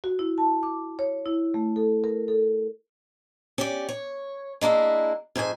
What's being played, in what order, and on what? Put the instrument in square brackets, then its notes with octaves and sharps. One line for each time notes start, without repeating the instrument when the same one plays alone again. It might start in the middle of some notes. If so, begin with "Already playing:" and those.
[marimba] F#4
E4
A5
D6
C#5
E4
A3
A4
A#4
A4
[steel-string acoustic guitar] C#4 G4 D5
C#5
G#3 A#3 D4 E4
F2 G#2 C5 G#5